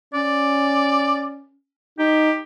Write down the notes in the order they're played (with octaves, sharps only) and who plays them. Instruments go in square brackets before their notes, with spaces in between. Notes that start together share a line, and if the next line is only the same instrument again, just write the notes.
[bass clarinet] C#4 [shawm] D5
[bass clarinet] D#4 [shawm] G4